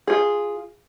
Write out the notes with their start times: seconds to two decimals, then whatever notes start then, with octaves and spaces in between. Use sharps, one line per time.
0.07 F4 G#4